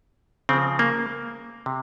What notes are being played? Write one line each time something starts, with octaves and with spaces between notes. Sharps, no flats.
C#3 F3 C4
A#3
C3